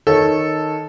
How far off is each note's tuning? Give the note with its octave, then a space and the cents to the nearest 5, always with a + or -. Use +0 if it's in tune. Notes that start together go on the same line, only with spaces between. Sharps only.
D#3 +0 A4 -5 C#5 -15